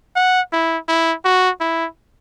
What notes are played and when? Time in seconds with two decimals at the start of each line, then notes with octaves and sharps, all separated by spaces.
0.16 F#5
0.52 E4
0.88 E4
1.25 F#4
1.60 E4